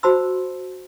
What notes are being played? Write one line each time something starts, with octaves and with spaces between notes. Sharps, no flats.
F#4 C5 A5 B5 C6 E6